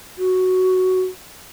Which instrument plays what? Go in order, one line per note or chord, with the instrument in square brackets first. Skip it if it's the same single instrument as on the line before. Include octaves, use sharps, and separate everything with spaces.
[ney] F#4